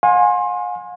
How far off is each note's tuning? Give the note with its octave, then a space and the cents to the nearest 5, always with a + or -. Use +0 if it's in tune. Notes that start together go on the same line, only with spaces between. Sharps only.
F5 +45 G#5 -10 C6 +25